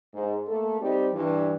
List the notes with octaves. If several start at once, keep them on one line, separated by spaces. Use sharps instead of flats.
G#2
A3 A#3 A4
G3 C4 D#4 G4
G2 E3